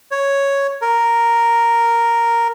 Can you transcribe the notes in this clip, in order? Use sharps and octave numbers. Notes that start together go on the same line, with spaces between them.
C#5
A#4